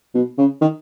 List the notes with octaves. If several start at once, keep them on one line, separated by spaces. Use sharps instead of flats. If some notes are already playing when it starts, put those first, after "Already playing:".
B2
C#3
D#3